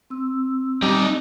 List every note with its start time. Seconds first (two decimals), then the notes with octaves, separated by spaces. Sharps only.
0.10 C4 E6
0.82 G3 D#4 D5